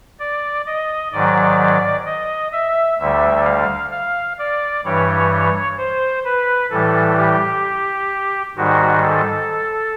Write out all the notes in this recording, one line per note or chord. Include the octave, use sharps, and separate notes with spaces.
D5
D#5
G#2 D#3 F#3 D5
D#5
E5
D2 D3 G3 E5
F5
F5
D5
G2 E3 G3 C#5
C5
B4
A2 E3 G3 A4
G4
G#2 D#3 G3 F#4
A4